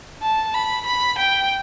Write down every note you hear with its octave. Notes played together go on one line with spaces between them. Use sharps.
A5
B5
B5
G5